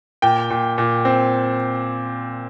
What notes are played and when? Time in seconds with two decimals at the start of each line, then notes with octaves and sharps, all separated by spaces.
0.22 A#2 G5
0.50 A#2
0.78 A#2
1.05 C4